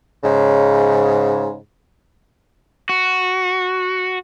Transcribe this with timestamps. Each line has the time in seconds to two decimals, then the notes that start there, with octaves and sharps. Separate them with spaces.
0.24 G#2 C#3
2.89 F#4